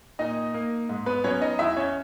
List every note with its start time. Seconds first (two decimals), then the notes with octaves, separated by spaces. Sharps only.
0.19 A#2 D#4 D#5
0.54 A#3
0.89 G#2
1.06 B3 B4
1.24 F#3 B3 C#4 C#5
1.41 D#4 D#5
1.59 E2 E4 E5
1.77 C#4 C#5